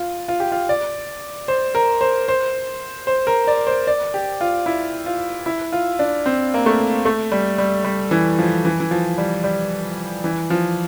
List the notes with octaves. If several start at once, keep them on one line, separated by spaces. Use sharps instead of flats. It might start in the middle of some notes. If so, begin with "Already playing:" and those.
Already playing: F4
F4
G4
F4
D5
C5
A#4
C5
C5
C5
A#4
D5
C5
D5
G4
F4
E4
F4
E4
F4
D4
C4
A#3
A3
A3
G3
G3
G3
E3
F3
E3
E3
F3
G3
G3
E3
F3